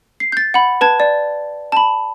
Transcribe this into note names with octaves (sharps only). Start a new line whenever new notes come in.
C7
G6 A6
F#5 B5
B4 A5 G#6
D5
A5 B5